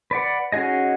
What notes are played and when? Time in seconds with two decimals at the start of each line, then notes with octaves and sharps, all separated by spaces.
0.11 B4 D5 F#5
0.52 C#4 D#4 F#4 G#4 D#5